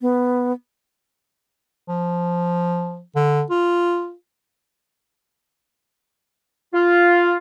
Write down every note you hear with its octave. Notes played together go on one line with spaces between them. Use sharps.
B3
F3
D3
F4
F4